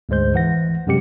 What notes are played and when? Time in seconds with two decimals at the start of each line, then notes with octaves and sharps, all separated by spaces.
0.09 D2 G#2 G#3 C5 G6
0.34 E3 F#5 A#6
0.87 F#2 C3 G#3 G4 C#7